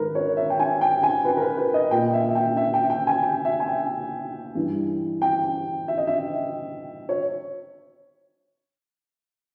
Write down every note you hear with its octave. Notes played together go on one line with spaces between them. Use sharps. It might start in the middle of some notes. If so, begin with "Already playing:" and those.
Already playing: G#2 D#3 A#4 B4
C#5
E5
G5
G#5
G5
G#5
B4
A#4
B4
B4
D#5
A#2 G5
E5
E5
G5
E5
G5
G5
G#5
G5
E5
G#5
G5
G2 E3
G5
E5
D#5
E5
C#5